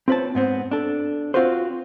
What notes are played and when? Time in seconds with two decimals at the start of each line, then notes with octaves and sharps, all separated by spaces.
0.08 C4 F4 B4 C#5 A5
0.35 G#2 B3 C4
0.71 D4 A4
1.34 C4 F4 F#4 B4 C5